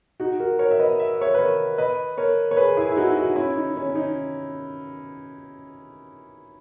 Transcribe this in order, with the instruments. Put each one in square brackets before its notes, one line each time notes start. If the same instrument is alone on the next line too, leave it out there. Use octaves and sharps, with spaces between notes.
[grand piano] D#4 F#4
F#4 A#4
A#4 C#5
E5
B4 D#5
E5
C#5 E5
B4
A#4 C#5
B4 D#5
A#4 C#5
C#5
G#4 B4
E4 G#4
E4
D#4 F#4
E4
D#4 F#4
C#4 E4
D#4
C#4
C#4
D#4